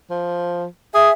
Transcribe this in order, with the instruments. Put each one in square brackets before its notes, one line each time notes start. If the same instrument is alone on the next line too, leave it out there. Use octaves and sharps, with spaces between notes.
[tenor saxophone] F3
[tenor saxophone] G#4 [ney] E5